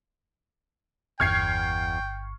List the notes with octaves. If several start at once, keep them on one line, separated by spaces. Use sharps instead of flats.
G1 E2 G5 C#6 F6 G#6 C7